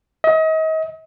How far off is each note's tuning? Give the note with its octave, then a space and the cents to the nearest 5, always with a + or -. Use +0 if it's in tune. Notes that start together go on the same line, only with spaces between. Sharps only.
D#5 +35